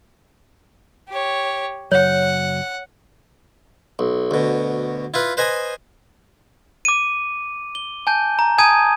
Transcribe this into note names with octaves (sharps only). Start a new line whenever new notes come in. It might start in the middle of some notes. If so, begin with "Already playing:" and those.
G4 C#5
F#1 F#3 C#5 F#5
B1
D2 B2
E4 F4 B4
B4 C5 D#5 G#5 D#6
D6 D#7
G7
G#5 A5 G6
A#5
G#5 A5 D#6 G#6 D#7